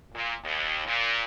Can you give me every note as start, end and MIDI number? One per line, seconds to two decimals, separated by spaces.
0.13 0.35 46
0.44 0.82 39
0.86 1.23 46